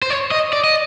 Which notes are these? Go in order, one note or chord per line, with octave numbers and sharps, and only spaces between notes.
C5
C#5
D#5
D5
D#5